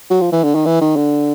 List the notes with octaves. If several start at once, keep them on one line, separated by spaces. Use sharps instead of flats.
F#3
F3
E3
D3
D#3
E3
D#3
D3